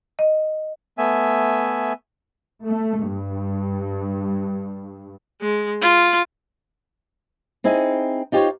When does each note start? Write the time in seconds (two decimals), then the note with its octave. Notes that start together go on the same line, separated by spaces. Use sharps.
0.19 D#5
0.98 A3 B3 E5 G#5
2.64 A3
3.05 G2
5.41 G#3
5.82 F4
7.64 C4 D#4 E4 G#4
8.32 D#4 F4 G4 G#4 C5 C#5